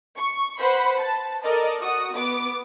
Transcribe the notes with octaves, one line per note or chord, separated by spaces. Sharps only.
C#6
B4 C5 F#5 B5
A5
A4 A#4 D5 D#5
F#4 D#6
B3 D6